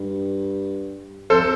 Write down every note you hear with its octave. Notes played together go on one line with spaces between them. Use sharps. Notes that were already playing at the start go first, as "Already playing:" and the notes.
Already playing: G2
F2 A4 C5